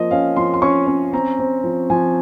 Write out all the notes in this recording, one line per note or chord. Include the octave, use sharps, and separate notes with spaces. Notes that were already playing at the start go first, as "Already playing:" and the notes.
Already playing: F3 A#3 D#5
C#4 F5
F3 C6
C6
C#4 C#6
C#4
C4 A#5
C4
F3
F3 G#5